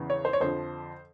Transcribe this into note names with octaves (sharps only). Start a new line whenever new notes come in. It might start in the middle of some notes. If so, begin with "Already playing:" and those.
Already playing: E2 C#3 E3
C#5
C5
C#5
F2 D3 F3 C5